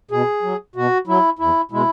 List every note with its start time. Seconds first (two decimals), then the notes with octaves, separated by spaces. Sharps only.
0.11 B2 G#4
0.43 F#3
0.76 B2 F#4
1.07 F#3 E4
1.39 E2 E4
1.71 B2 G#3 E4